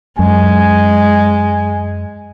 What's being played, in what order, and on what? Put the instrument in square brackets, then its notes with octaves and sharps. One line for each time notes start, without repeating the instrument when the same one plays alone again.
[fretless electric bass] F#2 [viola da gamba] G#3 [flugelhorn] G#5